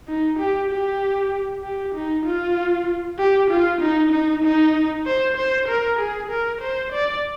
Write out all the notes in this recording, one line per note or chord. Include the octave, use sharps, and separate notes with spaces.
D#4
G4
G4
G4
D#4
F4
G4
F4
D#4
D#4
D#4
C5
C5
A#4
G#4
A#4
C5
D5